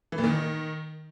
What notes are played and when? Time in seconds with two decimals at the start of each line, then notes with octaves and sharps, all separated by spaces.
0.12 E3
0.18 A#2
0.24 D#3